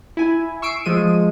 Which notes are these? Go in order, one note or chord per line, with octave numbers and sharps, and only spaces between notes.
E4 G#5
C#6 E6 C7 D7
F3 G#3 D#7